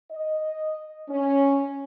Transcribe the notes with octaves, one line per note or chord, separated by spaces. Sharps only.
D#5
C#4